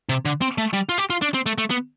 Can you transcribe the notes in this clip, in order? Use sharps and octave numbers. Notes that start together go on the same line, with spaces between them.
C3
D3
C4
A3
G3
F4
G4
F4
D4
C4
A3
A3
B3